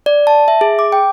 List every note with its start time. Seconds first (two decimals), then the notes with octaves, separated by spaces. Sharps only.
0.06 D5
0.27 A5
0.48 E5
0.61 G#4
0.79 D6
0.92 G5